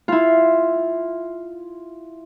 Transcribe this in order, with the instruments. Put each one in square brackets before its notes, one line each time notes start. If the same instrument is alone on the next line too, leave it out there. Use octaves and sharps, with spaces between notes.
[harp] E4 F4